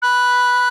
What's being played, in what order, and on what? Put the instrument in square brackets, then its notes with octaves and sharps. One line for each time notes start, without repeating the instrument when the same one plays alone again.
[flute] B5 [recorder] F#6